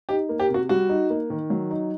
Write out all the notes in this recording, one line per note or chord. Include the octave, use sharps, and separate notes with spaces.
D#4 G4
A#3
G4
C3
F#4
G3 F#4
D#4
A#3
D#3
F#3
D#4